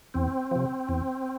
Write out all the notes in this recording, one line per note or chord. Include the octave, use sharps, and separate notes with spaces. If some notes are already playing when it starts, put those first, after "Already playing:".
E2 C4
C3 F3
E2